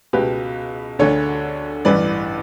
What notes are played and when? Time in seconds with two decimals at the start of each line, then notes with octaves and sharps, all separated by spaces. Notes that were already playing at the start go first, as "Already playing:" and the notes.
0.13 C#2 B2 G4 B4
0.99 D2 D3 A4 C#5
1.85 A1 G2 E3 B4 D5